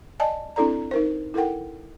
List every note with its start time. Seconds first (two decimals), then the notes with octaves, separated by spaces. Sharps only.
0.20 D5 D#5 G#5 A5
0.56 C4 D4 E4 A4 D5 A#5
0.91 D#4 A#4 C5
1.34 E4 A4 A#4 F#5 G5